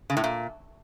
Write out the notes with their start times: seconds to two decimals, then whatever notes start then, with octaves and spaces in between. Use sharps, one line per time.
0.10 C#3
0.17 A2
0.24 A#2